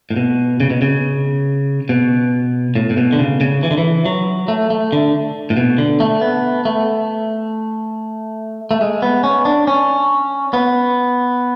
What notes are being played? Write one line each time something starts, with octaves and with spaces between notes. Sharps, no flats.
A2
B2
C#3
B2
C#3
B2
A2
A2
B2
D3
C#3
C#3
E3
D3
E3
F#3
A3
A3
D3
A2
B2
D3
A3
B3
A3
A3
G#3
B3
C#4
D4
C#4
B3